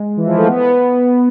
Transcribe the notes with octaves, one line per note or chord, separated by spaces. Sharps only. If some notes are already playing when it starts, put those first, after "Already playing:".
Already playing: G#3
E3
F3
A3
B3